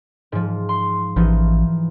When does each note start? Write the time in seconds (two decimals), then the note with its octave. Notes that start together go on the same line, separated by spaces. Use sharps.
0.32 G#2 F3
0.69 C6
1.16 A1 E3 F3 D#4